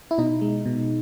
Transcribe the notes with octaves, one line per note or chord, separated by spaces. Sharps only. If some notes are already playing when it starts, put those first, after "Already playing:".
E4
B2 D#4
G#3
B2